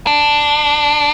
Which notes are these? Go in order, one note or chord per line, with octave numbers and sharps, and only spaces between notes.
D4